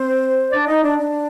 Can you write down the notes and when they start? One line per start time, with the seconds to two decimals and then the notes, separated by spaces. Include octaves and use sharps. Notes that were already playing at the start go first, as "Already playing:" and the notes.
Already playing: C4 C5
0.51 D4 D5
0.67 D#4 D#5
0.83 D4 D5
0.99 D4 D5